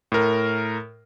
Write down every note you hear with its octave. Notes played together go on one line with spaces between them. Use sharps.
A2 A#4